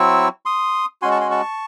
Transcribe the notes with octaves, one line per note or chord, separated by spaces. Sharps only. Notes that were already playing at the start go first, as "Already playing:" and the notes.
Already playing: F#3 C4 E4 C#6 E6
C6 D#6
G#3 C#4 F#4 G#5 C6
A5 C#6
G#5 C6
A5 C#6